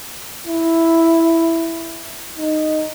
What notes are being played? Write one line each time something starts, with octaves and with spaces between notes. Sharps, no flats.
E4
D#4